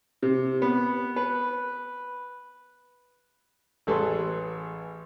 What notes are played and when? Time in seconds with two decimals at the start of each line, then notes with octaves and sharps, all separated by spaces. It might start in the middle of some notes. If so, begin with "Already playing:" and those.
0.22 C3
0.62 B3
1.16 B4
3.87 A1 G#4 A4 B4 C6